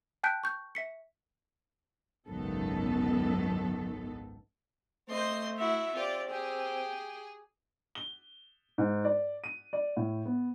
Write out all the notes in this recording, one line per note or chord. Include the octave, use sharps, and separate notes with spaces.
G5 A5 F#6 G6 B6 D7
C#6 G6
E5 B6 C#7
G#1 C#2 F#2 D#3 B3 A4
A3 C4 C5 D#5 C6
E4 F#4 E5
C4 F4 G4 D5
G4 G#4 G5
G7
G#2
D5
D#7
D5
A2
B3